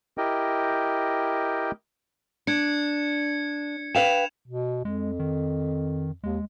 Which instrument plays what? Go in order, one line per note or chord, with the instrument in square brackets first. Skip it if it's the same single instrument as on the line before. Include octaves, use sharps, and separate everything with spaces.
[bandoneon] E4 G4 A#4 D#5 G5
[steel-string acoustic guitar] D4 [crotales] G#6 C#7
[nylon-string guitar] B4 F5 G5 [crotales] E7 F7
[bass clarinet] B2
[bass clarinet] F2 [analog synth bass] G#3
[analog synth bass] D#3
[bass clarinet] D#2 [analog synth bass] G#3